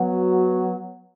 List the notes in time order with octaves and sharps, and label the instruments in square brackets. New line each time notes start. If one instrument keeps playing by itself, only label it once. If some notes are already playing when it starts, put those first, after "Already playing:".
Already playing: [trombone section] F#3 B3 F#4